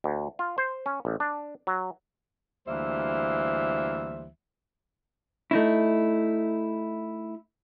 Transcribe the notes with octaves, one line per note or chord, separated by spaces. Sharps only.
D2
F4
C5
C#4
A1
D4
F#3
D2 E3 G3 A#3 C5 E5
A3 D#4 E4